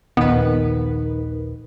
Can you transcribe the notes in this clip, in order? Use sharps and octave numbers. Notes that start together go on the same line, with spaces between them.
D#1 A#1 D#3 B3 B4